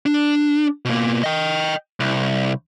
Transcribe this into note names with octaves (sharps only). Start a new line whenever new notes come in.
D4
B2 A#3
D#5 G5
C2